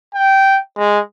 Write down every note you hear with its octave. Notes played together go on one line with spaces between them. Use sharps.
G5
G#3